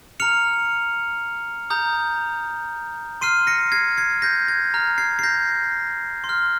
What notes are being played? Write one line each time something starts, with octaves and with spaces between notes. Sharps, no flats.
A#5 F6 C#7 F7
A#5 D#6 G6
C6 F6 C7 D#7
A#6 C#7
G#6 C7
G#6 C7
G6 A#6
G#6
A#5 F6
G#6 C7
C7
G6 A#6
C6
F6